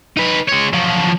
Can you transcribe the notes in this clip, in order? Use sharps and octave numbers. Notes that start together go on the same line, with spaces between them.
D#4 B4
G#3 C#5
F3 F#3